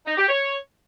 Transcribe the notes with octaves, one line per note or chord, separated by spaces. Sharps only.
D#4
G4
C#5